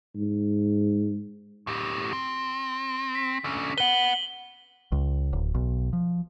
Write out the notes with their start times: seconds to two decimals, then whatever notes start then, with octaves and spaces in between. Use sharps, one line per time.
0.16 G#2
1.67 A2 G4
2.13 C4
3.15 B6
3.44 D3 C#4
3.78 B4 F#5 F#7 G7
4.92 C#2
5.33 D1
5.55 B1
5.93 F3